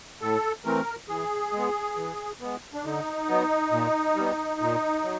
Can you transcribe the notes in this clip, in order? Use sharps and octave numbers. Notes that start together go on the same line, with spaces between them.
A2 A4
E3 A3 C4 A#4
E3 G#4
G#3 B3
E3
G#3 B3
D4
D3 D#4
F#3 B3
A#2
G3 B3
A#2
F#3